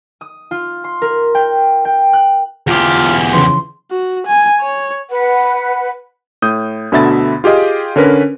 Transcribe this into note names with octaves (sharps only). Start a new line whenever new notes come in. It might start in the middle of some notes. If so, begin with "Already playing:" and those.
D#6
F4
C6
A#4
G5
G5
F#6
E2 F4 G4
C#3 E3 F3 C6
F#4
G#5
C#5
B4 F#5
A2 D#6 G6
D2 B2 D3 E5 B5 A6
F4 G4 G#4 D#5 F5
D3 C#4 A#4 B4